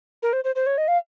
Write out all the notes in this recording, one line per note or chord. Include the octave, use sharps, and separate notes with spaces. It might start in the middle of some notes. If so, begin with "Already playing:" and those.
A#4
C5
C5
C5
C#5
D#5
F5